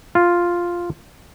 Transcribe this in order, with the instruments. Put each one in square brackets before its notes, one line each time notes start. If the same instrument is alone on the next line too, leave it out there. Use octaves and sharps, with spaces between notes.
[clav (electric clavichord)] F4